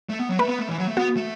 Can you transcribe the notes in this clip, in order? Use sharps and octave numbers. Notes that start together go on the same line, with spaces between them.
A3
B3
F#3
A3 B4
B3
A3
E3
F#3
A3
B3 F#4
A3